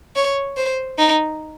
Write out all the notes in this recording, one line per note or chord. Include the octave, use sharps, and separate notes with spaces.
C#5
C5
D#4